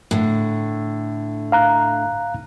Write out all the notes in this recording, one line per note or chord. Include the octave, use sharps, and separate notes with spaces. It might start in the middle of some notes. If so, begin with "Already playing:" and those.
A2 D3
F5 A#5 F#6